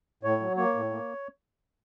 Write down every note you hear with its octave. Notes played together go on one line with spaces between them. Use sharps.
A2 C#5
F#3
A#3 C#5
A2
A#3